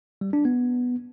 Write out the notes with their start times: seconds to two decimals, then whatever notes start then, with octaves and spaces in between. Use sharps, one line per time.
0.21 G3
0.33 D4
0.45 B3